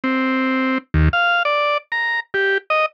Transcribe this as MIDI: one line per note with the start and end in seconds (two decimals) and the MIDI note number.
0.04 0.78 60
0.94 1.09 39
1.13 1.43 77
1.45 1.78 74
1.92 2.20 82
2.34 2.58 67
2.70 2.86 75